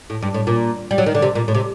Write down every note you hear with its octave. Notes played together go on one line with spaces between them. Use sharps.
A2
G2
A2
A#2
G3
F#3
D#3
D3
C3
A#2
A2
C3